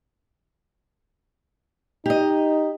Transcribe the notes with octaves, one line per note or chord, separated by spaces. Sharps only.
D#4 G4 D#5